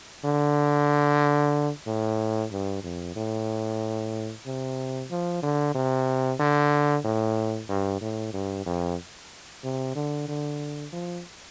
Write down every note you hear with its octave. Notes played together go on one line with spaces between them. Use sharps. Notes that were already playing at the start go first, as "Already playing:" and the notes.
D3
A2
G2
F2
A2
C3
F3
D3
C3
D3
A2
G2
A2
G2
F2
C3
D3
D3
F3